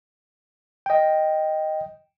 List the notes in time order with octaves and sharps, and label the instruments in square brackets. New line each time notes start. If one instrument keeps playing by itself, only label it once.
[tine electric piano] D#5 G5